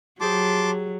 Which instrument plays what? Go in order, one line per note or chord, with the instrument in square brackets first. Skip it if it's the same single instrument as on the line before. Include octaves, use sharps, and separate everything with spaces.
[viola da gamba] F#3 [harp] G4 G#4 C5 [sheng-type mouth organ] A5 C6 D6